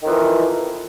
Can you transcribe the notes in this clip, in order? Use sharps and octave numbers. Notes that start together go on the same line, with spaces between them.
F2 D#3 E3